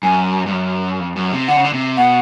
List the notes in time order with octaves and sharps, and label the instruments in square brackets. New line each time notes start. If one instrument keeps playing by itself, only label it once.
[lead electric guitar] F#2 [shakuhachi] G#5
[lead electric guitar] G2
F#2
F2
F#2
C3
[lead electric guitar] D3 [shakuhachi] F#5
[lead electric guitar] C#3
D3
C3
[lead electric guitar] B2 [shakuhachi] F#5